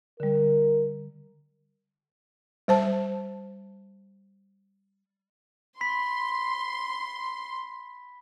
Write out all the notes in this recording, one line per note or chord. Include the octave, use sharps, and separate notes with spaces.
D3 G3 A#4
G3 C5 A5
B5 C6 B6